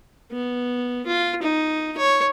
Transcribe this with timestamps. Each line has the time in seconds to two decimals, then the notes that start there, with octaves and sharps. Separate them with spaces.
0.32 B3
1.06 F4
1.43 D#4
1.98 C#5